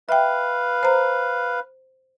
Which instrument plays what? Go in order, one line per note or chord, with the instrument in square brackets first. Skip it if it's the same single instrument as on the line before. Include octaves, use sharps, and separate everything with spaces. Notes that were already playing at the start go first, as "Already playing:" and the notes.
[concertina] B4 F5 [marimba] E5 G5
[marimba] C5 A#5